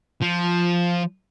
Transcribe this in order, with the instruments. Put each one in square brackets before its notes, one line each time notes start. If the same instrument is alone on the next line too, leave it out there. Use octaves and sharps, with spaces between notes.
[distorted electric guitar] F3